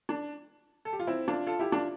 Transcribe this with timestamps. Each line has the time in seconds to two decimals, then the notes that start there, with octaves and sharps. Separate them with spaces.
0.09 D4
0.85 A4
0.93 G4
0.99 F4
1.07 C4 E4
1.28 D4 F4
1.47 F4 A4
1.59 E4 G4
1.72 D4 F4